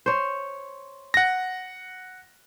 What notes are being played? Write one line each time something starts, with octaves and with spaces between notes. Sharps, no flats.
C5 C#5
F#5 A#6